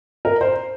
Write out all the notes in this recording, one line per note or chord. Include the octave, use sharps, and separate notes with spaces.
A#4
C5